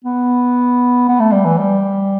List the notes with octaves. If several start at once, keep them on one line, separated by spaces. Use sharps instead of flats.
B3
B3
A3
G3
E3
G3